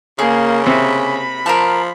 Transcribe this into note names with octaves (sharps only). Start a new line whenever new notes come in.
C#3 A#3 G#4
C3 B5
F3 A#4 F5 A5